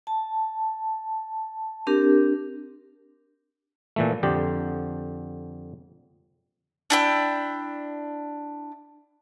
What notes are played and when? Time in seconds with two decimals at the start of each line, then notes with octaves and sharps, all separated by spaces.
0.07 A5
1.87 C4 D4 G4 A#4
3.96 A#2 E3 A3
4.23 F2 D3 G4
6.90 D4 E4 G5